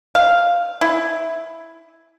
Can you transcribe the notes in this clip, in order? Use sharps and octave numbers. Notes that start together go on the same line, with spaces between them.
F5
E4